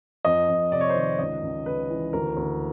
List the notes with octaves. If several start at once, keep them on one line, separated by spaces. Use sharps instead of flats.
F2 D#5
F2
C3 D5
C#5
C5
D#3 C#5
C#2 D#5
C#2
C#3 B4
E3
D2 A#4
D2